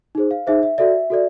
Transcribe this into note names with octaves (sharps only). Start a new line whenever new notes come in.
D#4 G#4 C5
F5
D#4 G#4 C5 E5
E5
F#4 A4 D5 E5
F#4 A4 D5